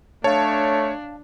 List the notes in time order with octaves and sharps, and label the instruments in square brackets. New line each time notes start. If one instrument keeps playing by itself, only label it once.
[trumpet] A3 [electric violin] D4 [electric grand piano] C#5 [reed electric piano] F5 A5